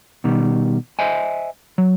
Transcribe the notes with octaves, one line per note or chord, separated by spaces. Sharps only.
B2 D#3 G3
C5 D#5 E5 G#5
F#3